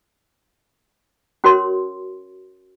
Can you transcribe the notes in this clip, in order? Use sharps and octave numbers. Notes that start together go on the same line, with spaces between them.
C#4 F#4 A#4 C#5 C6